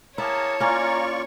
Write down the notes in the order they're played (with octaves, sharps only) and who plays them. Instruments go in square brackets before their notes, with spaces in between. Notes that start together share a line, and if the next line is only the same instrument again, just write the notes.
[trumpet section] A#3 G#4 A#4 [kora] E4 [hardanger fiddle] C#5 [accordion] A5
[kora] A#3 C#4 [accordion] F4 D5 C#6 [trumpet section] F5 G#5 A#5